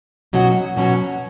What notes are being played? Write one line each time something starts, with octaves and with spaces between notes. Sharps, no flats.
B2 F#3 C#4 F#4
B2 F#3 C#4 F#4